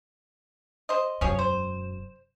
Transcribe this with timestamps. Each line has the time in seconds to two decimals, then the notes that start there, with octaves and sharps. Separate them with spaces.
0.89 C5 D#5
1.21 E1 F#2 F3 G#4 C#5
1.39 C5